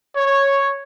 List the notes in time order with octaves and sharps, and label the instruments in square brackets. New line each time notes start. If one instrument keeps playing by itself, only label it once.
[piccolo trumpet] C#5